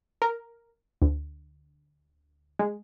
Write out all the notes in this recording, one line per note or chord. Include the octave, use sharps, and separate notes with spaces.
A#4
D2
G#3